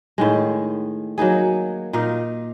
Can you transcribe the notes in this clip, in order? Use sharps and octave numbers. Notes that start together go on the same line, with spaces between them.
A2 D#3 G#3
F#3 A#3 D#4 G#4
A#2 D#4 A#4 F5